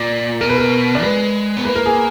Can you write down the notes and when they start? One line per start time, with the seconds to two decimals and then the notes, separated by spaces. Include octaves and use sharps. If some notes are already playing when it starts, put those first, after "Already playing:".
Already playing: A#2 D5
0.41 B2 A#4
0.49 B4
0.58 A#4
0.95 D5
1.03 G#3 B4
1.57 B3
1.65 A#3 B4
1.76 A#4
1.86 G#4